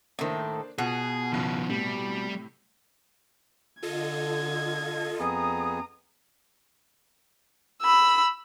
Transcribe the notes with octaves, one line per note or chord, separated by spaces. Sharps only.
A2 D#3 A#3 D4 C5
B2 F4 G#4 F#5
F#1 B1 G2 D#3 F3
A2 C3 G3
D3 F4 A4 D#5 G#6
F2 B3 G#4 A#5 D#6
B5 E6